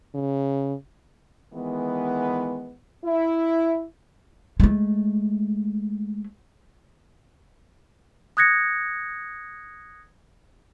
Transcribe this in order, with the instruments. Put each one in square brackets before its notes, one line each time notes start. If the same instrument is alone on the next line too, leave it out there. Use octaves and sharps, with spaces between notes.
[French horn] C#3
[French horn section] D#3 E3 G#3 B3
E4
[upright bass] G#3 A3
[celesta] D#6 F#6 G#6 A#6 C#7